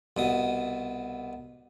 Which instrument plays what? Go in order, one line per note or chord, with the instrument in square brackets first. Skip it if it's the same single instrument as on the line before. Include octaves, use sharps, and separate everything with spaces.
[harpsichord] C2 B2 D#6